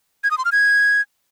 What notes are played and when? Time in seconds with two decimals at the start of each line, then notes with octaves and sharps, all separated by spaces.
0.24 G#6
0.31 D#6
0.38 C6
0.45 F6
0.52 G#6